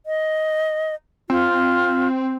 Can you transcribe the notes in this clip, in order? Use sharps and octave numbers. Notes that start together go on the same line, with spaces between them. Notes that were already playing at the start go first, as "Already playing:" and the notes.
D#5
C4 F4